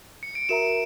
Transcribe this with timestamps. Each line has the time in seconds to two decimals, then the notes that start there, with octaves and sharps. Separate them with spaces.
0.23 C#7
0.35 D7
0.49 F#4 A#4 E5 A#5 E7